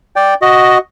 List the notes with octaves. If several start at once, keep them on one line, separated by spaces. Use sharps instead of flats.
D5 G5
F#4 D#5